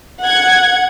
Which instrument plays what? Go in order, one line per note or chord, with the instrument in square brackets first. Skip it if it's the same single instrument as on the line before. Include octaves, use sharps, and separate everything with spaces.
[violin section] F#5 G#6